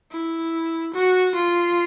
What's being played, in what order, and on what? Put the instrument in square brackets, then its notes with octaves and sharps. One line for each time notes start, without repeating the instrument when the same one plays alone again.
[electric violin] E4
F#4
F4